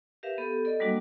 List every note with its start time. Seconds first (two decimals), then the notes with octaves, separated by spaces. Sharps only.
0.23 G4 A#4 B4 E5 F5
0.38 B3 G4 A4
0.65 A4 D5 D#5
0.80 F#3 G3 A#3 D4 F#4